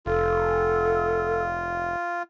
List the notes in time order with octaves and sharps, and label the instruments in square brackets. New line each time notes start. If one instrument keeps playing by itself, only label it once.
[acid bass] F1 [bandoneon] F4 [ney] A4